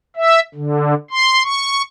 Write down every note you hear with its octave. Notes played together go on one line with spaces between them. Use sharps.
E5
D3
C6
C#6